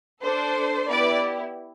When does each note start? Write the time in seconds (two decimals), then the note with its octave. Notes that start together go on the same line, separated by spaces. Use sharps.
0.22 D4 A4 C5
0.88 B3 E4 G4 B4 D5